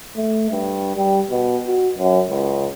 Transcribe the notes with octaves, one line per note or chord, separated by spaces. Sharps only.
A3
G2
G3
B2
F#4
F#2
C#2